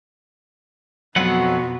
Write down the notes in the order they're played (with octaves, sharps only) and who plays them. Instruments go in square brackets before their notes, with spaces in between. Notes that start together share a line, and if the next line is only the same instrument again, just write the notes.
[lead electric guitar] F2 F#5 [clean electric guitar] B2 F4 B4 [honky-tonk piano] F#3 [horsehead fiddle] B3 F#4